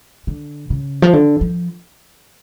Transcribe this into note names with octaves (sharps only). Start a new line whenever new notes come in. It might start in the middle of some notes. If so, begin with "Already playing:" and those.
D3
C#3
F3
D3
F3